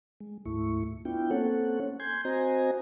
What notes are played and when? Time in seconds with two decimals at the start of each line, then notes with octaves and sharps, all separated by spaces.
0.20 G#3
0.45 D2 G#2 A3 E4 C#6
1.05 B3 D4 E4 F4 G5
1.31 A#3 C4 C#4 A4 C#5 F#5
2.00 G#5 C6 G6 G#6
2.25 C4 F#4 C5 D#5 G#5 A#5